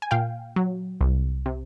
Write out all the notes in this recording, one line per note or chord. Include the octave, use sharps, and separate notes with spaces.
G#5
A#2 F5 G5
F#3
C2
C3